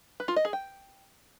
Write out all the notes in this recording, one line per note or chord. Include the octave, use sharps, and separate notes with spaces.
B4
F4
D#5
G#4
G5